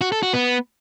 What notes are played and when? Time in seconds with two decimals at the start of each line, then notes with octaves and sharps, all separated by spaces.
0.01 F#4
0.12 A4
0.23 F#4
0.33 B3